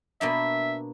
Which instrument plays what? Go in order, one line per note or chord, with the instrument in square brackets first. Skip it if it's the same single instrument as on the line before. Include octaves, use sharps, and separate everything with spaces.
[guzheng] B2 A#3 D4 [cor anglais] E5